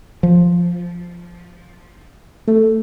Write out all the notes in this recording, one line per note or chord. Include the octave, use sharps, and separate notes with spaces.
F3
A3